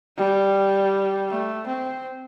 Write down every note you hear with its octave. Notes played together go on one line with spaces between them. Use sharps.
G3
A3
C4